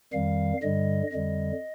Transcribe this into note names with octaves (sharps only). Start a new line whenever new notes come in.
F2 D#3 G3 F5
G2 D3 G3 D#5
F2 D3 G3 D#5